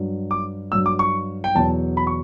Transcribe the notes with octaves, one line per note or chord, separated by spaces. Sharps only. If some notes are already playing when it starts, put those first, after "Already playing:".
Already playing: G2 F#3
D6
G2 F#3 E6
D6
C#6
G5
E2 B2 F#3 A5
B5
C#6